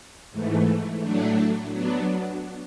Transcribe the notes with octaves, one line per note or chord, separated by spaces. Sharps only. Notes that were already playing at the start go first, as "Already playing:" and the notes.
G#2 E3 A3
A2 F#3 A3 D4
F#3 B3 D4